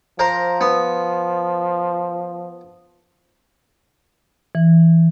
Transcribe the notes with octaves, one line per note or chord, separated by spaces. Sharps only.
F3 A#4 C5 A#5
B3
E3